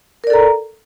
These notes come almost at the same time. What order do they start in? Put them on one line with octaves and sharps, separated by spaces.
A#4 D5 A4 A#5